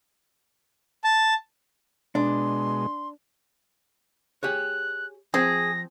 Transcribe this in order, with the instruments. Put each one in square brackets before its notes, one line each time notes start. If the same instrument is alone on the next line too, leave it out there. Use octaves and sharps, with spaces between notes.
[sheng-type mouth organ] A5
[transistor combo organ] B2 G#3 [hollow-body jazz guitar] D4 [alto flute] C6
[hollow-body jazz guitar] G4 G#4 C#5 [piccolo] F#6
[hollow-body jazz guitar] F3 C4 [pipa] G#4 [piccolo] A#6